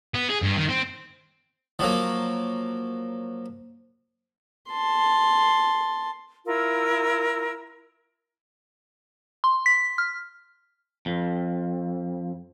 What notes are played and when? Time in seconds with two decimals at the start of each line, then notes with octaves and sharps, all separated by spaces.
0.14 B3
0.29 G#4
0.42 G2
0.56 D#3
0.69 C4
1.79 F3 F#3 A#3
4.70 A5 C6
6.46 E4 F4 A#4 E6
9.44 C6
9.66 B6
9.98 F6
11.06 F2